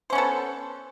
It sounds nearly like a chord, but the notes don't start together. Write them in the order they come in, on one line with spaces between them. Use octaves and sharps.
C5 C#4 B3 A4